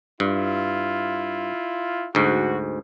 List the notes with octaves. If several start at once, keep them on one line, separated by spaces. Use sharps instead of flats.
G2 E4 F4
D2 G#2 F#4